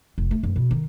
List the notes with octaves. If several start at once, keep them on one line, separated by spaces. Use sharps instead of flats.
F1
A3
F#2
B2
D#3